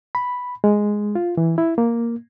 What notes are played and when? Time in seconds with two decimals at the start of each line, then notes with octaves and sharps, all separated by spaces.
0.15 B5
0.64 G#3
1.15 F4
1.37 E3
1.58 E4
1.78 A#3